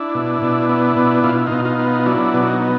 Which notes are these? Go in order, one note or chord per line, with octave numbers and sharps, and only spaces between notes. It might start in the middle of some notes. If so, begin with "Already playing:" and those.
Already playing: D4 E4
B2
B2
B3
B2
B2 F4
E4
B2 D#4 F4
D#4 F4
B3
F4
F#3 D4 E4
B2
E4
D#4
B3